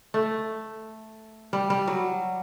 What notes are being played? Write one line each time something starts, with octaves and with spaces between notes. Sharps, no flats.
A3
G3
G3
F#3